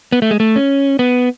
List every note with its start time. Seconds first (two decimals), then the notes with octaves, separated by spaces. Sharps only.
0.12 B3
0.22 A3
0.31 G#3
0.40 A3
0.56 C#4
0.99 B3